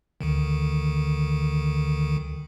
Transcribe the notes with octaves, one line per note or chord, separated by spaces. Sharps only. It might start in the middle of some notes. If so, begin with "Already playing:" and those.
D2 D3 D#3